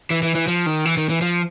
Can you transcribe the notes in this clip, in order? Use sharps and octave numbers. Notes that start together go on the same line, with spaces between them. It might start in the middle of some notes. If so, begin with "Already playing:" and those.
E3
E3
E3
F3
D#3
E3
D#3
E3
F3